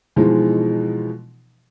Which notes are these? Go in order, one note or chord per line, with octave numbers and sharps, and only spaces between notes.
B2 E3 F3 G#3 D#4